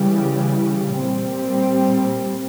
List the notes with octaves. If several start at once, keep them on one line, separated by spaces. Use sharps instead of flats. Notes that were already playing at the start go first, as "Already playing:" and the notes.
Already playing: C#3 E3 G3
A#2 G3 C4